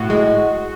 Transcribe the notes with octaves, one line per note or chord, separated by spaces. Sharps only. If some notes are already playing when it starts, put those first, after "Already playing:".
Already playing: A2 F#4
G#3